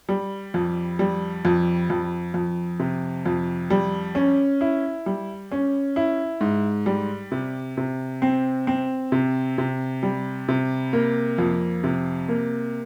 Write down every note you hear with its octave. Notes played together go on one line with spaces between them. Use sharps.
G3
F2
G3
F2
F2
F2
C3
F2
G3
C#4
E4
G3
C#4
E4
G#2
G3
C3
C3
C4
C4
C3
C3
G3
C3
A#3
F2
C3
A#3